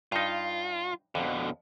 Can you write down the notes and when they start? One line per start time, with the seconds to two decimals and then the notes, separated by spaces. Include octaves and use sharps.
0.12 G2 D#4 F4
1.15 F2 B2 D3